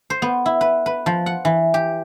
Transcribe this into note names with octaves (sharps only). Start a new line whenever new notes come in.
C5
B3
E4
B4
B4
F3
F#5
E3
G4